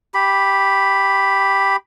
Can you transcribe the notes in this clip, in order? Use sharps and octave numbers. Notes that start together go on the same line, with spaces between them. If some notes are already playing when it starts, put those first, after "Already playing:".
G4 B5